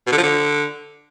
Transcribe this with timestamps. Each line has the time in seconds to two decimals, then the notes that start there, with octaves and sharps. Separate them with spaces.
0.07 B2
0.12 D3
0.17 F3
0.23 D3